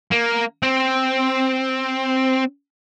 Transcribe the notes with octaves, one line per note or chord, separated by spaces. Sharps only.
A#3
C4